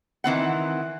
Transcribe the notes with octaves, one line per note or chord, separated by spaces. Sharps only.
D#3 E3 C4 F#5